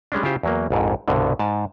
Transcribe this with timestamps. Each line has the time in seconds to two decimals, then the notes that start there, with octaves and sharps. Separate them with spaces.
0.12 G3 G#3 C#4 D4
0.23 C#3 E4 F4 G4 C5
0.43 E2 F#3 A#3
0.70 A#1 F2 G#2
1.08 C2 G2 B2 D3
1.39 G#2 A5